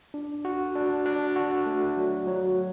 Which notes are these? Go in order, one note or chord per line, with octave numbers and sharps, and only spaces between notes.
D4
F#4
D4
D4
F#4
A3
F#3
F#3